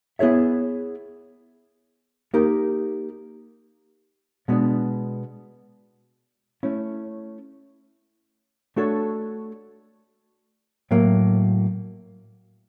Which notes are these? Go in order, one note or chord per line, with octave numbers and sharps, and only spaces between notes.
B3 E4 G#4 C#5 E5
A#3 D#4 G4 A#4
B2 G#3 B3 D4
A3 C#4 E4
A3 D4 F#4 A4 C#5
A2 F#3 A#3